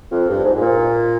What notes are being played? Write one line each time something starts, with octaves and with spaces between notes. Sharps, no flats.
F2
G2
G#2
G#2
A#2